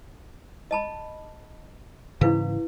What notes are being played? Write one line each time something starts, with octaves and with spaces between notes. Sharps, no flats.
D#5 A5 B5
G#2 C#3 E3 E4 B4 F5